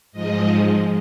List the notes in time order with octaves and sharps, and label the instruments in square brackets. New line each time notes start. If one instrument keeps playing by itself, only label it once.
[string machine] G#2 F3 G#3 D#5